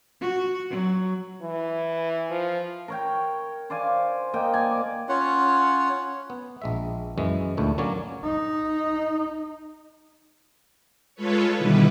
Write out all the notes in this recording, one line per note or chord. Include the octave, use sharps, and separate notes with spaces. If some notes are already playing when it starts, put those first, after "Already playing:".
F#4
F#3
E3
F3
A#4 C#5 G5
C5 D5 F5 G#5
A#3 D#5 G5
A#4 D5 G#5
D6
C#4 F4 C#5 F#5
B3
A#1 G#3 E5
F#2 E3 G#3
D2 A#2 A3 E4
F#3 A#3 C#4 C#5 D5
D#4
G#3 F4 A4 B4 C#5
B2 D3 D#3 G3 E4 B4